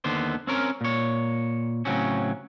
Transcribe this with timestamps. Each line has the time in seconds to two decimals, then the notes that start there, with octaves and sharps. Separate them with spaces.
0.04 D#2 D3 B3 C5
0.47 C4 C#4 A#4
0.81 A#2 C#5
1.85 A2 C#3 F#3 C4 C#4